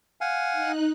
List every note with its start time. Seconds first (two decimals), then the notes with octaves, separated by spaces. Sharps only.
0.21 F5 F#5 G#5
0.53 D#4 F#6